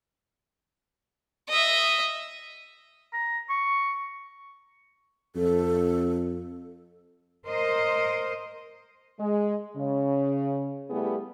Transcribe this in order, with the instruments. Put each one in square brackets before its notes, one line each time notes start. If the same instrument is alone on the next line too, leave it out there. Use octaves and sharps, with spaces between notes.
[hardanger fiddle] D#5 E5
[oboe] A#5
C#6
[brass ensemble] F2 [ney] A4
[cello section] A#4 C5 D#5
[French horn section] G#3
C#3
G3 A3 B3 E4 G4 G#4